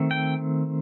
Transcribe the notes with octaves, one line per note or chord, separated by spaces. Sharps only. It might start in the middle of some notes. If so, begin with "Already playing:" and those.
Already playing: D#3 A3 C4
G5